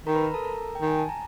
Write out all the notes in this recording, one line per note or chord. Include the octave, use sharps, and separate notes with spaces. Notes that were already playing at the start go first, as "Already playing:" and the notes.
D#3 A#4 A#5
B4 B5
A#4 A#5
A4 A5
A#4 A#5
G5
D#3 G#5
A5
A#5